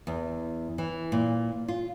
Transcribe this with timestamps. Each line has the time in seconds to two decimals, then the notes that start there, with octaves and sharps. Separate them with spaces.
0.07 E2
0.78 E3
1.12 A#2
1.68 F4